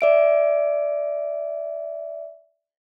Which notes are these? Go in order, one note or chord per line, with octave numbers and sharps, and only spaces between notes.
D5 E5 D7